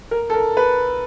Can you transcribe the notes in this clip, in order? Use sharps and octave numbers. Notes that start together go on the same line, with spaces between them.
A#4
A4
A#4
B4